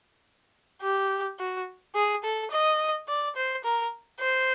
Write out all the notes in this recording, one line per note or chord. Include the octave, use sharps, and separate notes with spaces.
G4
F#4
G#4
A4
D#5
D5
C5
A#4
C5